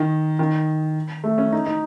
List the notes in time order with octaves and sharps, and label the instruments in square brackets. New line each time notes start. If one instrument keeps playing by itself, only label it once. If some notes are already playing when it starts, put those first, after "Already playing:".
Already playing: [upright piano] D#3
D#3
A3
C#4
D#4
D#4